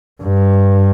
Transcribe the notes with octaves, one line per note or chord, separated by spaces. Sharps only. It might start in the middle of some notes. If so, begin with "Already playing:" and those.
G2